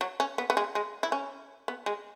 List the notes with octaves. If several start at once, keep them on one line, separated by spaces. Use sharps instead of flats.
F#3
C#4
B3
B3
G#3
G#3
E4
C#4
B3
G#3